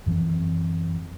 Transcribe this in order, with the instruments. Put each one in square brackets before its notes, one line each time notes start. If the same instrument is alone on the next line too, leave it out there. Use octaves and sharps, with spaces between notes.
[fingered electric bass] F#2 E3 F#3 C4